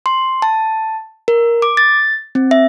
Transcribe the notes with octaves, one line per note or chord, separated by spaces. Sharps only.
C6
A5
A#4
D6
A6
C4
E5